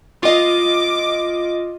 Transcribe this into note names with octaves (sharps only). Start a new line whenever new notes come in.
F4 D#5 D6